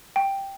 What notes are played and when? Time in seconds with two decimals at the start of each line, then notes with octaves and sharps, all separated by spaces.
0.16 G5